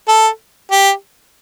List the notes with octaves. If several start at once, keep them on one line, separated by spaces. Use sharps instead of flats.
A4
G4